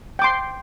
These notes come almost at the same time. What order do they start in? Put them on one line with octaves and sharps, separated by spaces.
G5 D6 C6